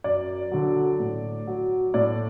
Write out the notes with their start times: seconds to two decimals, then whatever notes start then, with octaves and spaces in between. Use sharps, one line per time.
0.04 F#2 D5
0.51 D3 F#3
1.00 A2
1.47 F#3
1.94 A2 D5